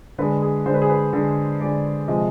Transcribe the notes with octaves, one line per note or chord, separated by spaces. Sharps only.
D3 G#3 B4
G#4
D3 G#3 C5
B4
G#4
B4
D3 G#3
D3 G#3 D5
C3 F3 G#3 D#5